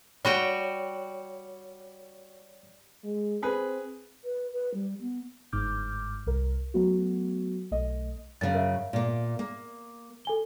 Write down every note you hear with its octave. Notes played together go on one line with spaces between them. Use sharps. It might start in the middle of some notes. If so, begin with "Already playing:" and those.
G3 F#4 C#5 G5
G#3
C4 G#4 B4
B4
B4
G3
B3
G1 G#2 D6 F6 G6
C2 A#4
F#3 A3 B3 F#4
B1 A3 D#5
F#2 C#3 F5 A6
A#4 E5 F5
A#2 A#3
A#3
A4 G#5 G7